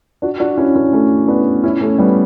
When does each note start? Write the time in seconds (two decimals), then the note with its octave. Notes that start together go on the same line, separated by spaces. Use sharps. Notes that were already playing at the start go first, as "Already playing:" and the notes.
0.22 D4 F#4
0.40 D4 F#4
0.57 C#4 E4
0.76 C#4 E4
0.93 A3 C#4
1.28 B3 D4
1.64 C#4 E4
1.81 A3 C#4
1.99 G3 B3